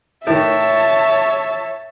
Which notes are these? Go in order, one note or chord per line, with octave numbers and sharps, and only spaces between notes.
A2 D#3 C#5 E5 A5